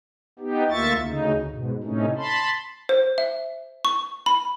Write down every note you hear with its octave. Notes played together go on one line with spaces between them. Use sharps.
B3 D#4 G4
D2 A#3 F4 E5 C#6 A6
D2 C#3 D#4
G#2 B2
A2 C3 A3 C#4 D#4
A5 B5 C6
C5
E5
C#6
B5